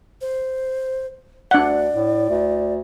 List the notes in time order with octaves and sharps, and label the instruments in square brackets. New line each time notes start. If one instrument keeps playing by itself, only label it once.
[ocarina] C5
[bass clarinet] D2 [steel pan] D4 F#5 [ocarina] D5
[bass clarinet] A2
D2